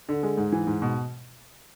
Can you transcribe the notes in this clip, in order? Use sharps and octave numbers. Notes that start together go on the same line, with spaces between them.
D3
G#3
G#2
E3
G#2
B2